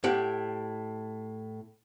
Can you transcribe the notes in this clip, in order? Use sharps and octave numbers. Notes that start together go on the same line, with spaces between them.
A2 G4 F#5